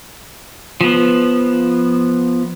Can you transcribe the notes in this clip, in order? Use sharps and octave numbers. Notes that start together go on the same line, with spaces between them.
F3 B3